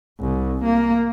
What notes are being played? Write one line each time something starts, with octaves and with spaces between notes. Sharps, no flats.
C2
A#3